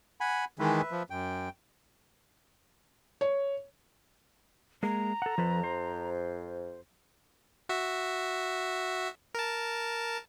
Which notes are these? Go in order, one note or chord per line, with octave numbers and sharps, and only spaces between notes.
F#5 G#5 B5
D#3 E3 G#3 B4 E5
F3
F#2 G5
C#5
G#3 A#3 G#4 A#5
A4 F#5
F2 F3 A4 B4
C5
F#4 E5
A#4 A5